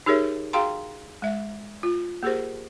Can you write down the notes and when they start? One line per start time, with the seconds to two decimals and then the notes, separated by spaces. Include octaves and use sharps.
0.06 D#4 G4 G#4 A#4 C#5 E5
0.53 F#4 G#4 F5 G5 A#5 C6
1.22 G#3 E5
1.83 F4
2.23 A#3 G4 G#4 A#4 C5